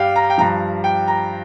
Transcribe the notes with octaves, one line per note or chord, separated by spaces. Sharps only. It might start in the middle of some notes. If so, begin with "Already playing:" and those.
Already playing: G2 G3 F5 G5
A#5
G5
G2 F3 A#5
G5
A#5